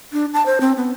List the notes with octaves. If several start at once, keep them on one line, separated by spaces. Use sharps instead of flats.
D4
A5
C5
C4
B3